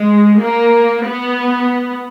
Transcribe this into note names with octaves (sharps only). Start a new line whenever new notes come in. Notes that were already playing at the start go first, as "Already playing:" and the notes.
Already playing: G#3
A#3
B3